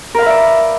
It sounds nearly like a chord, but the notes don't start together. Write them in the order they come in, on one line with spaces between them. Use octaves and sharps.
A#4 F5 B4 E5 D5